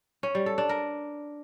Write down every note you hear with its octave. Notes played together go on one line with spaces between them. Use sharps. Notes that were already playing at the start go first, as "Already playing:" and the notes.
C#4
G3
A4
D4
A#4